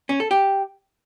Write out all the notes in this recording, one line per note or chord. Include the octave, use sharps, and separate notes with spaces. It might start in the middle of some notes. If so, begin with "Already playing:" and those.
C#4
A4
G4